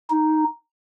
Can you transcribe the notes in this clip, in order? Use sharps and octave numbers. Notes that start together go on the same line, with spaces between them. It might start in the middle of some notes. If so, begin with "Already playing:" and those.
D#4